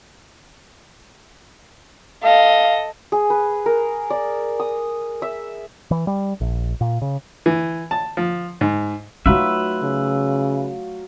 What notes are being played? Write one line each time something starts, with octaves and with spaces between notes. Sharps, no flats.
A4 D#5 F5
G#4
B4
A#4
D5
D#6
E5
E3
G3
A#1
A#2
C#3
E3
A5
F3
G#2
F#3 A3 D#4 F4 B4 E5
C#3